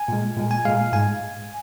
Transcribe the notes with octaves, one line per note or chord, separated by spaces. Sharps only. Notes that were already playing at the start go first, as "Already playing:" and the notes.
Already playing: G#5
A#2 G#3
A#2 G#3
G#5
A#2 G#3 F5
G#2 G#3 G#5